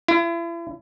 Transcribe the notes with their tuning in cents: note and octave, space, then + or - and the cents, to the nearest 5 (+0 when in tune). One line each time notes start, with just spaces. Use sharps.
E4 +40